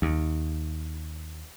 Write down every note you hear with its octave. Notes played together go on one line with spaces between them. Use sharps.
D#2